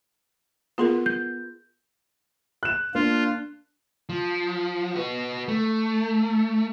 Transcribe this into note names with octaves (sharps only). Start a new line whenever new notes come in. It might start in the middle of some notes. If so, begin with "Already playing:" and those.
B3 F4 G#4 A#4 C6
G6
F#6 E7
A#3 D4 F4
F3
F#4 B4
A3